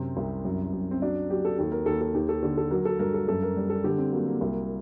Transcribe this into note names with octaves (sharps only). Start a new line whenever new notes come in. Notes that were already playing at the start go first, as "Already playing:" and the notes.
Already playing: F#2 C3 C4
C2
F#2
F#2
C4
F#3 D4
F#3 G4
A4
D#2 A4
A#4
D#2 A4
A4
D#2 G4
A4
D3
A4
F#3 A#4
A4
G2 A#4
A4
F#2 A4
A#4
G3
A4
D3 G4
C4
F#3 A#3
A#3
C2